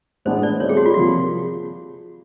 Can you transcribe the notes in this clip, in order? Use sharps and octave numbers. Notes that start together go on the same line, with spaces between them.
A2 E3 G#3 B3 D4 C5
D5
D#3 G3 C4 E4 A4 C#5
G#4
F#4
F4
C3 F3 A#3 F#4